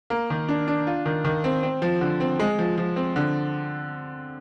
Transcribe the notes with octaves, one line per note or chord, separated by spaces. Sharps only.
A#3
D#3
D4
D4
F4
D#3
D#3
C4
C4
F3
D3
C4
G#3
F3
F3
C4
D3